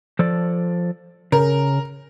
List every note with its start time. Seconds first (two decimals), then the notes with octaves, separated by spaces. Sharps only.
0.19 F3 A4 D5
1.32 C#3 A#4